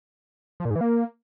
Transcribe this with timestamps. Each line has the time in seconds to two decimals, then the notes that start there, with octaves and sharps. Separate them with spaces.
0.60 F3
0.65 A#2
0.70 G#2
0.76 E3
0.81 A#3